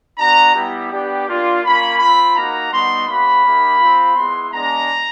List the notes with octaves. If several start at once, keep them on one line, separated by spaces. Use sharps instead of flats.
B3 D4 F#4 A#5
G3 B3 E4 G4
B3 D4 G4
A#3 D4 F4
A#3 C#4 F4 B5
C4 F4 B5
A#3 D#4 F#4 A#5
G3 B3 D#4 F#4 C6
A#3 C#4 F#4 B5
A#3 D#4 G4
C4 F4
G#3 B3 E4 C6
G#3 B3 D4 A#5